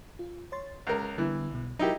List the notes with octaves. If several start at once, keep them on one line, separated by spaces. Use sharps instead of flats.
F4
C#5 C6 A6
C#2 A#4 F#6
D3 E3 G3 B3
B1 B2
F#3 D#4 E4 F#4 G4 A#4